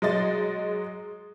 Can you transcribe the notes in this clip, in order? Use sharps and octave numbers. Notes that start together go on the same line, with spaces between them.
F#3 G#3 D#5 A6